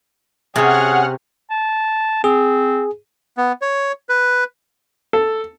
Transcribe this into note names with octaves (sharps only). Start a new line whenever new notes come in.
C3 C#4 G#4 F#5 F6
A5
C4 G#4
B3
C#5
B4
A4